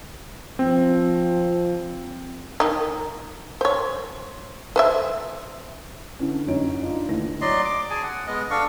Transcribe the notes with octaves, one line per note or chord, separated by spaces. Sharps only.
F3 C4
D#3 D#4
C5 C#5
B4 C5 E5
D3 E3 C#4
F#2 C#4 D#4 C#5 D7
D4 D#4 F4
D#2 D3 E3 A3 A#6
F#3 D5 D#5 C6
D6
G#4 G#5 A5
F#5
G#3 B3 D#5
D4 A4 F5 C#6